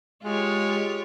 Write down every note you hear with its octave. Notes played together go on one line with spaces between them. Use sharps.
G#3 F4 G4 C#5